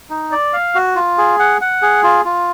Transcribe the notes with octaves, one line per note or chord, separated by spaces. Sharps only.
D#4
D5
F5
F#4
F4
G#4
F#5
F#5
G#4
F4
F4